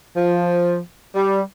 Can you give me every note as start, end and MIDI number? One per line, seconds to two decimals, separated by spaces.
0.16 0.79 53
1.15 1.40 55